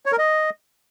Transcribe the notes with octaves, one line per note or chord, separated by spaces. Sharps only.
C#5
A#4
D#5